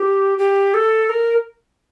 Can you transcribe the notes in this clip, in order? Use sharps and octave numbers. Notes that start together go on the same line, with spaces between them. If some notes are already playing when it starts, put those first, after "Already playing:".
Already playing: G4
G4
A4
A#4